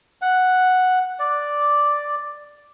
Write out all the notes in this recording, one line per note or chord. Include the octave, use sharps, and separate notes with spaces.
F#5
D5